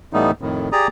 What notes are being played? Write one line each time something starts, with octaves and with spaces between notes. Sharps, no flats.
A2 E3 G3 A3 B3 D#4
F2 A2 D#3
G4 G#4 D5 A#5 D#6